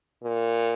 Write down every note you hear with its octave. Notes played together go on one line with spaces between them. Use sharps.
A#2